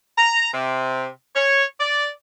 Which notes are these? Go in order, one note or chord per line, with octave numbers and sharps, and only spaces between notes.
A#5
C3
C#5
D5